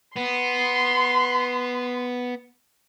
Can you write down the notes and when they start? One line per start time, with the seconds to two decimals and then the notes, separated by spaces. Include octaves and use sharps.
0.17 B3 C6